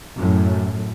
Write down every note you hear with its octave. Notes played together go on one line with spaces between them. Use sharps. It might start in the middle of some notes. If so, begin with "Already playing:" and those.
F#2 A2